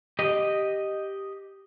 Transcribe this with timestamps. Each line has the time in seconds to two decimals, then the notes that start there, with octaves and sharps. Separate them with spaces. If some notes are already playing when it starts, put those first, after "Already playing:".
0.19 G4 D#5